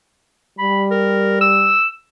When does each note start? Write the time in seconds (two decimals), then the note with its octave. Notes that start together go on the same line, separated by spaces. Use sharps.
0.59 G3 B5
0.91 A#4
1.41 E6